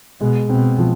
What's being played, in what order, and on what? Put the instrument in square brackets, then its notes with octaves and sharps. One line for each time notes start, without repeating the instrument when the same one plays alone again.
[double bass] B2 [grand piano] G#3
[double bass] B2 [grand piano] C4
[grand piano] F3